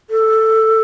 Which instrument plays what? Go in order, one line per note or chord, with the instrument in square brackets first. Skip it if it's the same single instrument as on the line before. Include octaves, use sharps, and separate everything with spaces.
[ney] A4